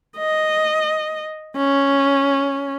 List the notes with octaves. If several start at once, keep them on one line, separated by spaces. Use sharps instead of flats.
D#5
C#4